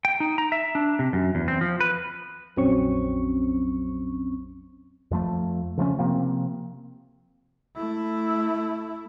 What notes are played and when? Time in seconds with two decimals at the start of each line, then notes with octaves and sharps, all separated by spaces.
0.05 G5
0.20 D#4
0.38 A#5
0.52 E5
0.75 D4
0.99 C3
1.13 F#2
1.35 E2
1.48 C4
1.61 F3
1.80 B4
2.57 A#1 F2 F#3 C4 C#4 C#6
5.11 F2 F3 A3
5.77 C#3 F3 A3 C#4
5.99 C3 F3 A#3 C4
7.76 A3 E4